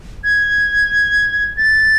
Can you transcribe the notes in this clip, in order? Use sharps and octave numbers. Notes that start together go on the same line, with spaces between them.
G#6
A6